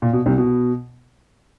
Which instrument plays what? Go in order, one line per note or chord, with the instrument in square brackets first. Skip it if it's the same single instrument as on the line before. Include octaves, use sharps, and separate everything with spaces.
[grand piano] A#2
B2
C2 C3
B2